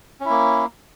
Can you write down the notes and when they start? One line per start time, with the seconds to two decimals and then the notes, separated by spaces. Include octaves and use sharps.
0.20 C#4
0.25 E4
0.30 A#3